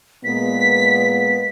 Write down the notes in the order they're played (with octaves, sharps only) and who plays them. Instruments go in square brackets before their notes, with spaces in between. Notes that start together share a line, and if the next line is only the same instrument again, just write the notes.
[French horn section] A#2 G#3 B3 [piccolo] B6